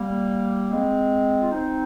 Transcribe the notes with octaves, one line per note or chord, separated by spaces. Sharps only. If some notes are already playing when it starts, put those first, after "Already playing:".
Already playing: G3 A#3
G#3 C4
F4
C4 D#4